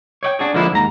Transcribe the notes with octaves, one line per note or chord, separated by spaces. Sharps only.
C#5 D5 G5
D4 F#4 G#4
D3 F3 G#3 A#3 D4 E4
D#2 G#2 A#5